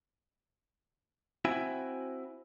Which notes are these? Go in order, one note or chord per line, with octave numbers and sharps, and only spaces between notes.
C4 E4 F#4 E5 G5 G#5